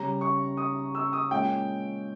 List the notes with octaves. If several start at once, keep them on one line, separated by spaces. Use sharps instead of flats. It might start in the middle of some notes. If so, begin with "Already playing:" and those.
Already playing: C#3 G3 C#4 A#5
C#6
D#6
E6
D#6
A#2 G#3 C#4 G5